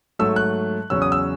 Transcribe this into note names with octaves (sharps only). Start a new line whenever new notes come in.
G#2 F#3 A3 E6
F#6
E2 C#3 F#3 C#4 E6
D#6
E6